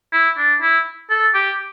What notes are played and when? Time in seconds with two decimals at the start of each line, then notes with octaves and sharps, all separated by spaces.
0.13 E4
0.38 D4
0.62 E4
1.10 A4
1.35 G4